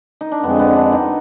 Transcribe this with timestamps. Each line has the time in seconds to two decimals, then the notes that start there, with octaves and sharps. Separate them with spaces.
0.21 D#4
0.32 D4
0.43 F2 D3 G#3 B3
0.59 B3
0.76 D4
0.92 D#4